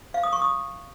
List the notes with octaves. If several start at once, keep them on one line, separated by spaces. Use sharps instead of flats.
F5
D#6
C#6
D#6